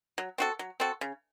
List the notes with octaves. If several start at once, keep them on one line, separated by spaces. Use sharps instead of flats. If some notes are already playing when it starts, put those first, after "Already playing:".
F#3
C4 F#4 A4
F#3
C4 F#4 A4
C#3